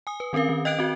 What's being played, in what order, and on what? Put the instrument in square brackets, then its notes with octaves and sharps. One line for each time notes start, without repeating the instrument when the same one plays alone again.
[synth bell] G#5 D#6
B4
D#3 C4 C#4 A#4 F5
D#3
D#5 G5 F#6 G#6 D7
C4 F#4